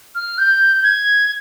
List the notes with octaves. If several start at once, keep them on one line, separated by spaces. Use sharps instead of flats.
F6
G6
G#6